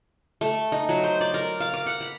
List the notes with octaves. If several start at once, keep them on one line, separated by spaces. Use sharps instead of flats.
A3
D#4
F#3
C5
D5
A#4
F5
D6
F#5
B5